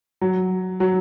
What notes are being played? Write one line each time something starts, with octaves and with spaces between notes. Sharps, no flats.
F#3
F#3